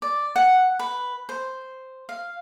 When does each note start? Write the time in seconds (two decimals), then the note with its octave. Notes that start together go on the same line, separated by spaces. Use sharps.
0.02 D5
0.36 F#5
0.79 B4
1.29 C5
2.09 F5